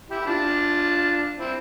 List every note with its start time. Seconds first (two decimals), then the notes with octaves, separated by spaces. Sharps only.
0.10 E4 G4
0.21 G4
0.26 D4 F4
1.38 C4 E4